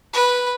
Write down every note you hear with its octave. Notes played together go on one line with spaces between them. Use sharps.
B4